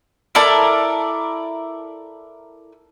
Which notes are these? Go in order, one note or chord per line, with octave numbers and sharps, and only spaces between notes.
E4 A4 A#4 D5